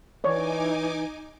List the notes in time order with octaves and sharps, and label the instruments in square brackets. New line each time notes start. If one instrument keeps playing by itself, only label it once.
[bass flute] E3 [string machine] D#4 G#5 D6 [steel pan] C#5 D5